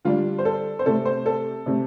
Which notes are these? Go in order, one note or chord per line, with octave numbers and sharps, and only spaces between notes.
D3 G3 D4 F4
C5
A4
C5
C3 A3 C4 A4
C5
A4
C3 A3 C4